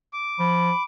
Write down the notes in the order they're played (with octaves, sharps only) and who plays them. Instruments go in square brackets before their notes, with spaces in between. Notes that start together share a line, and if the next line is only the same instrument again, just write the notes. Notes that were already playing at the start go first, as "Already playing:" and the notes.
[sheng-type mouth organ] D6
[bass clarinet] F3 [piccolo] B5